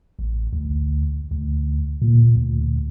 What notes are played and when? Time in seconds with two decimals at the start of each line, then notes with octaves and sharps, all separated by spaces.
0.19 A1
0.53 D2
1.31 D2
2.02 A#2
2.36 D2